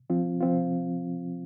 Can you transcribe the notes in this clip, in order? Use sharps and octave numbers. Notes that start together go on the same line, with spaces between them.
F3 C4 F4
F3 C4 F4